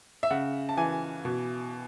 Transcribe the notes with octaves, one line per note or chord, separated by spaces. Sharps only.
E5
C#3 F#5
A5
E3 G#5
B2